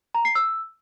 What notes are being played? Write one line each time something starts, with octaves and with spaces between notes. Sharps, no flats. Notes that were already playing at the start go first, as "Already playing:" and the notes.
A#5
C7
E6